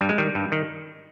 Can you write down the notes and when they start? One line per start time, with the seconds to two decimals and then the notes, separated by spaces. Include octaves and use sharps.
0.01 G2 G3
0.09 G#3
0.18 D#3 G3
0.35 G2
0.52 D#3